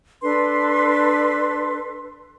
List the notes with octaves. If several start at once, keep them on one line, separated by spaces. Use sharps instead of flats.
D4 A4 B4 C6